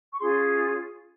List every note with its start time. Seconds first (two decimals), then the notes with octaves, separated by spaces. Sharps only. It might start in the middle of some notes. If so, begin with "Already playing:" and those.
0.12 C#6
0.20 C#4 F4 G#4 C6